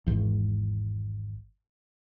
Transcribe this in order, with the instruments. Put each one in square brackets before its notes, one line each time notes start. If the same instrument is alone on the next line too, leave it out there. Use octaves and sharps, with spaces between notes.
[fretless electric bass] G#1 E2